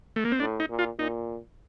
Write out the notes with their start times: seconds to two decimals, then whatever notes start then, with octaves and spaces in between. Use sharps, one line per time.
0.16 A3
0.25 A#3
0.32 C4
0.40 A2 D4
0.60 D#4
0.69 A#2
0.79 F4
0.98 A#2 D#4